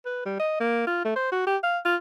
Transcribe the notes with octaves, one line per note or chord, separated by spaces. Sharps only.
B4
G3
D#5
A#3
F4
A3
C5
F#4
G4
F5
F4